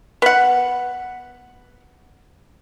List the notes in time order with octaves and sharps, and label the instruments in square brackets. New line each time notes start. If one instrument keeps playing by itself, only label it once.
[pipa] B3 F#5